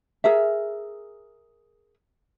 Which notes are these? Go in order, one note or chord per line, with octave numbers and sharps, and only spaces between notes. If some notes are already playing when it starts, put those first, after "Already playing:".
G#4 A#4 E5